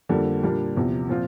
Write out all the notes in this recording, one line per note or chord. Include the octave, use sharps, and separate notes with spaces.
F2 D3 G3 A#3
A#2 G3 A#3 D4
E2 C3 F3
A#2 F3 C4 F4